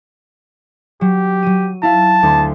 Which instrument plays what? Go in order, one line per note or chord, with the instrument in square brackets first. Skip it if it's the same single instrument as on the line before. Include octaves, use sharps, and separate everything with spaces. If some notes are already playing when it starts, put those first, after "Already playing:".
[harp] F#3 [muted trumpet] G4
[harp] F#3 D#7
[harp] E4 F5 [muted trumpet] A5
[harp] D2 C6